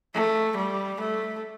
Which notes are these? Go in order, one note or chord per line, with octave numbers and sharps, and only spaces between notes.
A3
G3
A3